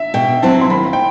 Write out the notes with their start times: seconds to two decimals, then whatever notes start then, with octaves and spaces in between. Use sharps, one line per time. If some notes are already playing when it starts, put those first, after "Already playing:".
Already playing: E5
0.14 B2 G5
0.42 F#3 C4 E4 A5
0.61 C6
0.70 D#2 B5
0.93 G5